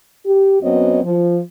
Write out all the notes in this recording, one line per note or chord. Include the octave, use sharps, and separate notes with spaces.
G4
F#2 B3 C4 F#4 C#5 D#5
F3